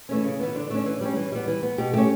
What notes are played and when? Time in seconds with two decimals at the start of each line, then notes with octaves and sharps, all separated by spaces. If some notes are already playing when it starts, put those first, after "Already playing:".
0.09 E3 A3 C#4
0.24 C#3
0.40 E3 B3
0.55 D3 D4
0.70 A3 C#4 D4
0.86 E3
1.01 G3 C#4
1.16 E3
1.32 G3 B3
1.47 E3
1.63 B3
1.78 B2 G4
1.93 A3 C#4 G4